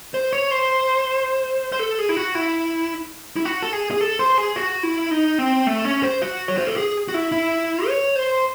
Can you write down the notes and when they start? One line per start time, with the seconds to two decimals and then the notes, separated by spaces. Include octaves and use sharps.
0.14 C5
0.33 C#5
0.51 C5
1.72 C5
1.79 A4
1.99 G#4
2.09 E4
2.17 F#4
2.35 E4
3.36 E4
3.45 F#4
3.63 A4
3.73 G#4
3.91 G#4
4.01 A4
4.19 C5
4.38 G#4
4.56 F#4
4.83 E4
5.11 D#4
5.38 C4
5.67 A3
5.85 C#4
6.03 C5
6.22 F#4
6.48 C#5
6.58 C5
6.67 A4
6.77 G#4
7.08 F#4
7.14 E4
7.32 E4
7.87 C#5
8.16 C5